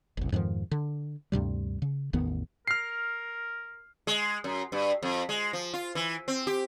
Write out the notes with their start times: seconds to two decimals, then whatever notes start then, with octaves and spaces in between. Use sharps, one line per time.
0.17 F#1 C2
0.32 F2 G#2 D#3 F3
0.71 D3
1.32 D2 G2 C3 G3
1.82 C#3
2.13 A1 E2 D#3 B3
2.68 A#4 F6 C7
4.07 G#3
4.44 F#2
4.72 G2
5.03 F2
5.29 G#3
5.53 F3
5.74 F4
5.95 E3
6.28 C4
6.47 G4